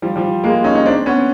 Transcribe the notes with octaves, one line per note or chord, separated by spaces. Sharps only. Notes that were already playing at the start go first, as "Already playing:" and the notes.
F3 G3
F3 G3
G#3 A#3
C#4 D#4
C#4 D#4
C4 D4
B3 C#4